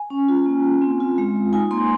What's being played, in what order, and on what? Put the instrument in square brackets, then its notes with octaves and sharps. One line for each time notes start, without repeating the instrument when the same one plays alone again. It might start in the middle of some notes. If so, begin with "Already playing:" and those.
Already playing: [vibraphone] G#5
C#4
F4
A#3
A#3
C4
F4
G#3
G#3
D#4 G#5
A#3 C6